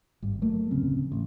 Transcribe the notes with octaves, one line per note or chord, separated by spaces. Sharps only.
G#1 G2
F#3 A3 A#3
D1 F2 C#3 C4
A1